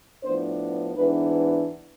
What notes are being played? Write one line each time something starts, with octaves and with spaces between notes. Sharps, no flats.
A2 F3 B3 D4 C5
G#2 E3 B3 D4 B4